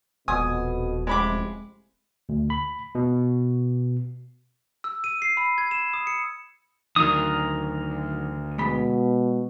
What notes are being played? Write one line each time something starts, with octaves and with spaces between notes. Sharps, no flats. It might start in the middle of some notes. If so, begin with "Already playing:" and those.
D#1 F2 B2 G#5 D#6
A1 F2 C3 G#3 B5 D6
D2
B5
B2
E6
D#7
C7
B5
G#6
E7
D#6
C#7
D2 D#3 F#3 A#4 D#6
B2 G#3 B5